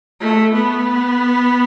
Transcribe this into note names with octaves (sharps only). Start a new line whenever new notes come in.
A3
B3